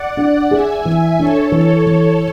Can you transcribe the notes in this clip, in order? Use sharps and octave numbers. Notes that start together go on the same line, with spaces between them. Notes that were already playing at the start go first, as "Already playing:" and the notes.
Already playing: D5 F#5
D4
G#4 E5 G#5
E3
D4 A4 C#5
E3
E3